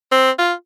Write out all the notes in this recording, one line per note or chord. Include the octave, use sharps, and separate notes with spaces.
C4
F4